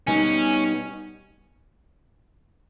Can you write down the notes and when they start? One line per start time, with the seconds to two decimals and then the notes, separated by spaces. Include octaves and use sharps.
0.07 B2 G3 B3 C#4 D#4